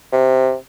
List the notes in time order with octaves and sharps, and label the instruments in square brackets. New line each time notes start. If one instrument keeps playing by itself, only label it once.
[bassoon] C3